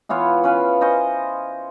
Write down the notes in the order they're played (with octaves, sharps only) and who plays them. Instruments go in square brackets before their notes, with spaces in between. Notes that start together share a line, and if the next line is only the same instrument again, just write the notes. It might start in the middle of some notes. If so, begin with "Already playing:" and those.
[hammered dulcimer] E3 B3 F4 C#5
C#4 B4 F5
C5 D#5 G#5 C#6